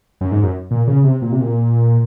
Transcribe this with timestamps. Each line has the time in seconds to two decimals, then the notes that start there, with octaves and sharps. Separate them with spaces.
0.21 F#2
0.31 G#2
0.43 F#2
0.71 A#2
0.87 C#3
1.04 C3
1.22 A#2
1.32 C3
1.41 A#2